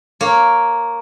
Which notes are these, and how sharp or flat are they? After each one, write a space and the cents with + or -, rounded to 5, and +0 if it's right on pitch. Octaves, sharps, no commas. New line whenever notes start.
A#3 +0 C#5 -5